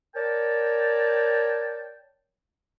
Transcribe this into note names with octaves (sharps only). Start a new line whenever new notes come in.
A#4 C#5 D5 G5 A5